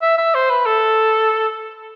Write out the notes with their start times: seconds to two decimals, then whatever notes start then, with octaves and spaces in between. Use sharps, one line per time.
0.02 E5
0.18 E5
0.35 C5
0.50 B4
0.66 A4